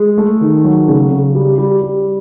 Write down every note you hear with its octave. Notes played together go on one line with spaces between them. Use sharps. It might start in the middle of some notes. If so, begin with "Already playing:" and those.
Already playing: G#3
A3
D#3
F#3
C#3
C#3
G3
G3
G3